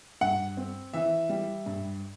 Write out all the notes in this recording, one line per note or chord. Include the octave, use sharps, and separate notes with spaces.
G2 F#5
C4
E3 E5
G3
G2